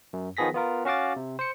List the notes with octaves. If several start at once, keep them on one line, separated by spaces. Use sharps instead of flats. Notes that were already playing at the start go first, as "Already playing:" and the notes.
F#2
D#3 F3 B3 G#4 A#6 B6
B3 F4 A#4
C#4 F#4 F5 D6 A6
C3
C5 C#7